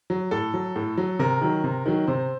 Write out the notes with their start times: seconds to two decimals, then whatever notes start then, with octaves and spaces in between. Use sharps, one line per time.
0.10 F#3
0.31 A2 A4
0.54 F#3
0.76 A2
0.97 F#3
1.19 C3 A#4
1.41 D#3 F#3
1.64 C3
1.86 D#3 F#3
2.07 C3 C5